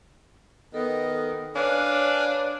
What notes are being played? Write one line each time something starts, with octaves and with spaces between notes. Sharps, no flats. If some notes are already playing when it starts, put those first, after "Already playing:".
D#3 B3 A4 D#5
D4 B4 C#5 F5 G#5